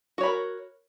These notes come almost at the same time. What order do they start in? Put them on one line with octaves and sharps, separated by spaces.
F#4 C#5 B5 A#4